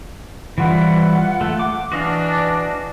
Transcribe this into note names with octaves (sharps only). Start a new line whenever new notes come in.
E3 G3 E4 F4 F#5
A3
D6
E3 D4 F#4 D#5 F5